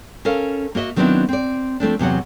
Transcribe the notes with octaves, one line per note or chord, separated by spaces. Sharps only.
C#4 A4 A#4 F5
A#3 F#4 D#5 E5
D#3 F#3 B3 C4 D4 E4
C4 D5
F3 A3 C4 D4
E2 C3 F#3 F#5